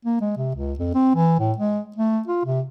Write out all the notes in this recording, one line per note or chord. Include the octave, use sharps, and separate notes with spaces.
A#3
G#3
C3
C#2
F2
C4
E3
A2
G#3
A3
F4
C3